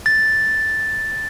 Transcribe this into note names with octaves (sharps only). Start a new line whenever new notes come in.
A6